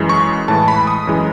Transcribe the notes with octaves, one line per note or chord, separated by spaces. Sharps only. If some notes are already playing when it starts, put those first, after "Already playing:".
Already playing: F#2 E3 G#3
C#6
A2 E3 G#3 A5
B5
D#6
F#2 E3 G#3